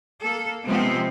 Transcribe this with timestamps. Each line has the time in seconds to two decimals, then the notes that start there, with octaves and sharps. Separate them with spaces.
0.23 A#3 A4
0.64 C3 F3 G#3 B3 C4